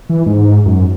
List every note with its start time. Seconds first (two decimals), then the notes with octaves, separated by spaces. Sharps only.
0.09 E3
0.26 G#2
0.66 F#2